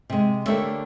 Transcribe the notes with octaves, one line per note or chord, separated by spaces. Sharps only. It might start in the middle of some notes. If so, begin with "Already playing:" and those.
C3 G#3
D3 A3 A#3 G4 C#5 E5